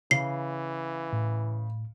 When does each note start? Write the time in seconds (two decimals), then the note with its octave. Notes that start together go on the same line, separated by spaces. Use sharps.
0.11 C#3 E3 C7
1.13 A2